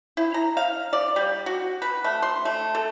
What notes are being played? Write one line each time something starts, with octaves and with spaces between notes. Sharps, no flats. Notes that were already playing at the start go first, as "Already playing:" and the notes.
E4
A#5
F5
D5
G3
F#4
B4
A3
C6
A3
A4